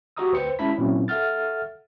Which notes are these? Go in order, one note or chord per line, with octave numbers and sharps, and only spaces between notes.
F#4 G4 D#5 A#5 D#6 E6
D2 B4 C5 G5 C#7
G#3 C#4 E4 A5 B5 B6
A#2 F#3 C4 C#4 E4
A4 E5 F#5 F6 A6